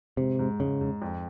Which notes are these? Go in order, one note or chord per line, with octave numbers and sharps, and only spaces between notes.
G#2 C3
G#2
G#2 C#3
G#2
F2